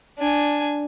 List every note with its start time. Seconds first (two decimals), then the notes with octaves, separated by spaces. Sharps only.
0.18 D4 G#5